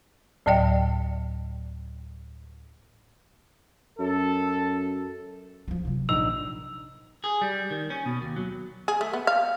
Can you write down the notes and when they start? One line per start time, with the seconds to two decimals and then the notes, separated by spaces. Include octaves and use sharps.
0.46 D2 A2 F#3 D5 D#5 G5
3.99 F#2 A4
5.68 F3 G3
5.85 C3 F#3
6.09 A#1 D#4 E6 F7
7.24 G#4
7.42 G3
7.71 D#3
7.90 C#4
8.06 B2
8.22 D#2
8.36 F#3
8.88 G#4
9.01 A3
9.13 B3
9.27 F5